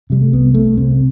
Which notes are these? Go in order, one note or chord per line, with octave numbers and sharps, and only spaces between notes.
C3 G3
A3
C2 B3
C2 A3
C3 C4